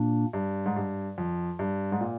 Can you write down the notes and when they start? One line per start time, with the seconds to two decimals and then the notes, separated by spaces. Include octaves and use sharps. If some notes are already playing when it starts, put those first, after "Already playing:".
Already playing: A#2 A#3 D4
0.33 G2
0.66 G#2
0.76 G2
1.18 F2
1.59 G2
1.92 G#2
2.01 A#2